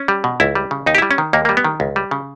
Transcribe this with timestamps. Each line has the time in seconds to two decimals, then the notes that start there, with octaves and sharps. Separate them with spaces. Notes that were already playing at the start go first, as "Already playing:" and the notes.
Already playing: C#4
0.08 G3
0.24 B2
0.40 C#2 E4
0.55 G3
0.71 C#3
0.86 D#2 D#4
0.95 G4
0.98 G3 E4
1.11 C#4
1.18 D#3
1.33 D#2 A#3
1.45 G3 A#3
1.57 B3
1.65 D#3
1.80 C#2
1.96 G3
2.11 C#3